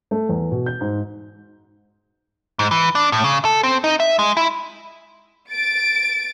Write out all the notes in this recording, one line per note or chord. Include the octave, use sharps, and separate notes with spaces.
A3
E2
B2
G6
G#2
G#2
E3
D4
A2
C#3
A4
C4
D#4
E5
G#3
E4
A6 D7